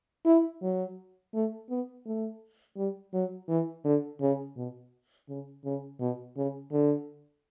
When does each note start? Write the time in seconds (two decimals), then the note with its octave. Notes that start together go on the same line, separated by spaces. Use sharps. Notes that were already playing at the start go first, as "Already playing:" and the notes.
0.25 E4
0.62 F#3
1.34 A3
1.70 B3
2.05 A3
2.77 G3
3.14 F#3
3.48 E3
3.85 D3
4.21 C#3
4.56 B2
5.29 C#3
5.65 C#3
6.00 B2
6.37 C#3
6.72 D3